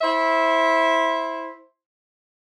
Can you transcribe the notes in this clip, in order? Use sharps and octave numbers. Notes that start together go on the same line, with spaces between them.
E4 C5 E5